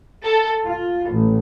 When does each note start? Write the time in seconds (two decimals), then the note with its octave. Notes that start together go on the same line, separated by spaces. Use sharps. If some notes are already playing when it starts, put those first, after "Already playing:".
0.24 A4
0.66 F4
1.10 A1